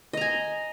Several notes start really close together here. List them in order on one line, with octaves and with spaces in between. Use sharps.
D#5 A#5 G#5